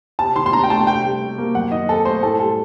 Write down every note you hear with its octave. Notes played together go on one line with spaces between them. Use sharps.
C3 A5
D#3 C6
C6
D4 A#5
G5
A3 A5
C3 G5
G3
C3
A#3
F#2 F#5
D#3 D#5
C4 A4
A3 C5
A2 A4
G3 A4